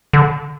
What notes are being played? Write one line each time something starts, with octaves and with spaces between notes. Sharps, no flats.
D3